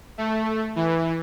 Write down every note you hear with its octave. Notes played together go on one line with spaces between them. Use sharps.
A3
E3